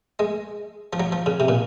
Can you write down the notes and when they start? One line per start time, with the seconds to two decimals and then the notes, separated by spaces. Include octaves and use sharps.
0.19 G#3
0.93 F3
1.00 F#3
1.12 F3
1.26 C#3
1.40 C3
1.48 A#2